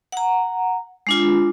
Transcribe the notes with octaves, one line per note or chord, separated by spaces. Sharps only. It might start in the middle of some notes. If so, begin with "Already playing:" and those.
F#5 A#5
G#3 D4 F4